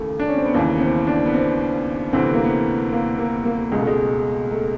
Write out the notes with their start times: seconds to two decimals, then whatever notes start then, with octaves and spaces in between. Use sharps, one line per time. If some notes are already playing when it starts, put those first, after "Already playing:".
Already playing: D#2 C#3 E3 A3
0.19 D4
0.28 C#4
0.37 C4
0.45 B3
0.54 D#2 C#3 E3 A#3
0.76 B3
0.80 C4
1.07 D4
1.26 B3
1.34 C4
2.13 D2 C3 E3 C4
2.23 B3
2.34 A#3
2.44 B3
2.92 A#3
3.19 A#3
3.45 A#3
3.72 C#2 G#3
3.76 B2 A3
3.87 G#3
4.51 A3